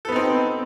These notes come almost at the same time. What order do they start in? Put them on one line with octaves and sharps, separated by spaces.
A4 B3 D#4 C4